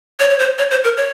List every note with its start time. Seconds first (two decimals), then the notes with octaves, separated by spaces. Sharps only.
0.20 C#5
0.30 C#5
0.39 C5
0.58 C#5
0.71 C5
0.84 A#4
0.97 C#5